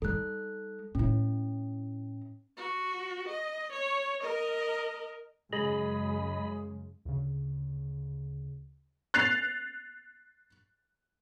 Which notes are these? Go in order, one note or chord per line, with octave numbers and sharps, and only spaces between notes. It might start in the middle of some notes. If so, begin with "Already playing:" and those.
G3 D#4 A4 F#6
A2 C#4 E4
F#4
D#5
C#5
A#4 D#5
F#2 C#3 G#3 G#4 D#5 B5
D2 C#3
F#6 A6 C7 F7